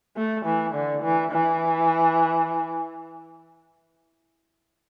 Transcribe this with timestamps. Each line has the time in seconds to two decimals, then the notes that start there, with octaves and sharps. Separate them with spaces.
0.17 A3
0.46 E3
0.75 D3
1.03 E3
1.32 E3